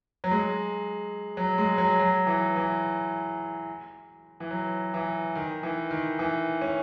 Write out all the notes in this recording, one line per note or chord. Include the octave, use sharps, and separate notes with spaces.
F#3
G#3
F#3
G#3
F#3
F#3
E3
E3
E3
F#3
E3
D#3
E3
D#3
E3
C#4